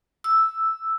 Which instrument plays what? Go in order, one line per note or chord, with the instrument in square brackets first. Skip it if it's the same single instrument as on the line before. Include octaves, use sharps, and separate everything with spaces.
[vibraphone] E6